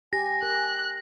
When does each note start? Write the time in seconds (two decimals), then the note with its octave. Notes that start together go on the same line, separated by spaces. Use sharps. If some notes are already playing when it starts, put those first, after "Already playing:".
0.13 G4 G#5 A#6
0.43 A#4 F#6